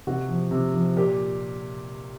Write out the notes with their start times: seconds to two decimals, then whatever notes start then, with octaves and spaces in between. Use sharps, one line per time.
0.07 C3 F#4
0.28 F3
0.51 C3
0.74 F3
0.96 A#2 G4